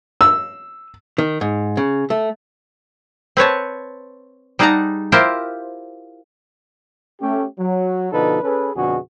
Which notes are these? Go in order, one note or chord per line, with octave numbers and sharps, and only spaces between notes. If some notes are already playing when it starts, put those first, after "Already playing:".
E6
D#3
G#2
C#3
A3
C4 B4 C#5 A5
G3 D#4 G#4 F#5 A5 A#5
E4 F4 G4 A#4 C5
A3 C#4 G4
F#3
B2 D3 F3 D#4 A4 B4
C#4 G#4 A4 B4
F2 B2 D3 F#4 G#4